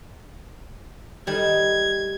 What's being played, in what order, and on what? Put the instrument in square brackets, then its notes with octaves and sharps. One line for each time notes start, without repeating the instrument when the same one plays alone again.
[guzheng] D#3 G3 [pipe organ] G#6